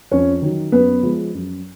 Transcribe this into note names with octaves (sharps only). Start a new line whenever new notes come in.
F2 C#4 C#5
D#3 F#3
F#2 B3 B4
F3 G#3
F#2